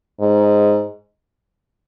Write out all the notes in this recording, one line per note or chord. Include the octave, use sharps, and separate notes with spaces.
G#2